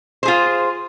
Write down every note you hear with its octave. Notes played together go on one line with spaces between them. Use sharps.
F4 G#4 C5